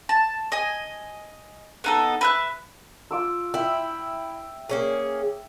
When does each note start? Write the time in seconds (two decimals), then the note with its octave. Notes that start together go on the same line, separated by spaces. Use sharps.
0.09 A5
0.52 D#5 G#5
1.84 B3 D#4 A4
2.21 B4 E5 F#6
3.11 F4 D6 E6
3.54 E4 E5 G5
4.69 A#3 C#4 G#4